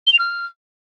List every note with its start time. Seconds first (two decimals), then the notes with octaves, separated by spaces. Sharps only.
0.06 G7
0.12 F7
0.18 F6